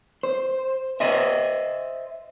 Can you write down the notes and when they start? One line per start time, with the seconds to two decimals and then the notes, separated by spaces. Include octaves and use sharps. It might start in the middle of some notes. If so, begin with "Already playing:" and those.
0.23 C5
1.00 C5 D#5 E5